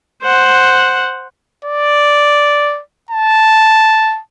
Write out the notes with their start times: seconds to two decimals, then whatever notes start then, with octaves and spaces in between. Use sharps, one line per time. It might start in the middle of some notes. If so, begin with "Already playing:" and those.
0.23 C5 F#5
1.65 D5
3.11 A5